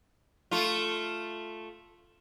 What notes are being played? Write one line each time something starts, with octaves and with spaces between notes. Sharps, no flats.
A3 F4